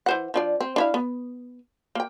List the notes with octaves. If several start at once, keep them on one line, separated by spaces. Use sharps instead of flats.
E3 C5 F#5
F3 D4 D5
C4
D4 E4 F5
B3
A#3 G5